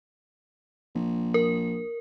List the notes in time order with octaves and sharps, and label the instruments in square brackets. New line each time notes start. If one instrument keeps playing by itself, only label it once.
[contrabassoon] A#1
[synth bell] A#4